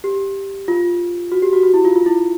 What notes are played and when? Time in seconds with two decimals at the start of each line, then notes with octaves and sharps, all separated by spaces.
0.04 G4
0.68 F4
1.32 F#4
1.42 G4
1.53 F#4
1.63 F#4
1.74 E4
1.85 F4
1.96 F4
2.06 E4